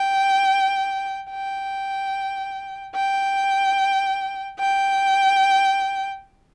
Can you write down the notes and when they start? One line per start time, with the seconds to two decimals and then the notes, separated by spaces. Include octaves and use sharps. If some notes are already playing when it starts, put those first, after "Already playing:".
Already playing: G5
1.31 G5
2.95 G5
4.59 G5